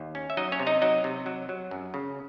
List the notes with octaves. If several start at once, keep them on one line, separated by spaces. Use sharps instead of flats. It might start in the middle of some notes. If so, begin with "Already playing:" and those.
Already playing: D#2
C#4
E5
F#3 D#4 D#5
C#4 C#5
C3
D#4 D#5
F#3 D#4 D#5
C3
F#3
F#3
F#2
C#3